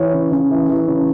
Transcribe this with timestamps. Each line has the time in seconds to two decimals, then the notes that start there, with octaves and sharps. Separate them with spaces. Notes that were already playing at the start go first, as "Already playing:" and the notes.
Already playing: E3 C#5
0.13 C#3
0.32 C#3
0.51 E3
0.69 E3
0.88 C#3